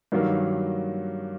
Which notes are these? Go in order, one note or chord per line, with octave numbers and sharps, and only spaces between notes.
G2 D#3 F#3 A#3